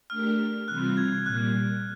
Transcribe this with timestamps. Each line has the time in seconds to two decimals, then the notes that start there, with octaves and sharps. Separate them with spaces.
0.10 A3 D4 G4 A#4 F6
0.68 C3 E3 G3 C4 F4 F#6
0.97 G#6
1.26 A#2 G3 A#3 F#6